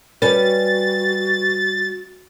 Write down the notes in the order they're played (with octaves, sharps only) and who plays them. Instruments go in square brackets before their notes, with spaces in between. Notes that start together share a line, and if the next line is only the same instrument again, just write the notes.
[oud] G3 C#4 [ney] F#4 [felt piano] B4 [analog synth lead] A6